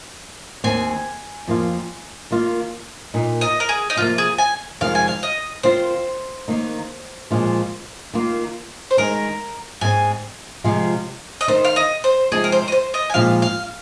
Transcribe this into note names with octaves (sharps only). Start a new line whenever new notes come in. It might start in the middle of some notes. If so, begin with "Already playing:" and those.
D#2 D#3 C4 G#5
F2 F3 A#3 F4
D#3 A#3 F4
A#2 A#3 D#4
D#5
A#4
G#4
D#4
C3 F3 A#3 F4
G#4
G#5
F2 C3 D#3 G#3 C4 F5
G#5
F5
D#5
D#3 C4 F4 C5
D#3 A#3 D#4
A#2 F3 G#3 F4
D#3 A#3 F4
C5
D#3 G#3 D#4 A#4
G#2 G#3 C4 G#5
C3 F3 G#3 F4
D#5
D#3 C4 D#4 C5
F5
D#5
C5
C3 F3 G#3 C4 D#4 G#4
A#4
C5
D#5
C5
D#5
G#5
A#2 F3 G#3 C4 D#4 F5
F5